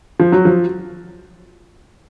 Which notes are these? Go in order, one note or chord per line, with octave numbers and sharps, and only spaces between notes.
F3
F#3
F3